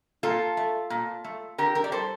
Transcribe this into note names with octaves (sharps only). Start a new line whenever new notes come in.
A#2 F4 A4
A3
A#2
A3
D3 G4 A#4
G4 A#4
D5
G3 A4 C5